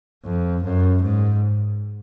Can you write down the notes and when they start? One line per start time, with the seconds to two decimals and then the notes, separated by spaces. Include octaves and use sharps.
0.24 F2
0.64 F#2
1.02 G#2